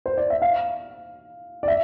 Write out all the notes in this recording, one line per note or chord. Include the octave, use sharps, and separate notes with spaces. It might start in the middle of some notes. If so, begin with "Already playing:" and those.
C5
D5
E5
F5
D5
E5